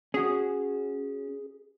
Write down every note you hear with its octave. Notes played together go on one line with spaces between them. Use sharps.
C#4 F#4 G#4